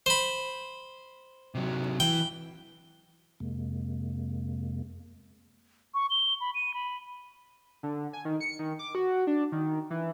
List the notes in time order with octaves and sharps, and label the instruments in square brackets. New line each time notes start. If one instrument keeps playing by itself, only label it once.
[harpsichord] C5 B5
[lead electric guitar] C3 F#3
[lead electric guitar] E3 [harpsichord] G5
[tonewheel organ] F2 C3 G#3 A#3
[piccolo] C#6
G7
B5
D#7
B5
[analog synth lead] D3
G#5
D#3
C#7
D#3
D6
F#4
D4
D#3
E3